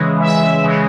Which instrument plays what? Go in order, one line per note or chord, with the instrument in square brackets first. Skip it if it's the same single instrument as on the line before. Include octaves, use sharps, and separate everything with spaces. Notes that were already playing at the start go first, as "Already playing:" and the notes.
Already playing: [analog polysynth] C#3 E3 G#3
E5
C#3 E3 G#3